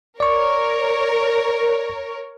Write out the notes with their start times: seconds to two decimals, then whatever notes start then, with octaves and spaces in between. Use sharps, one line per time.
0.20 A#4 C#5 D5 C#6